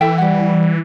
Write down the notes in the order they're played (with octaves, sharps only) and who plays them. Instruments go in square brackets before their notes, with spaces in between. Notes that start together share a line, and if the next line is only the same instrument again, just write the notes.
[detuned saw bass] E3 [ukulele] A4 E5 G5
[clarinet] G3 [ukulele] G4 F#5